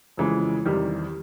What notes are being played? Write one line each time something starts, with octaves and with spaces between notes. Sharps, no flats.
F2 C#3 E3 G#3
E2 C3 D#3 G3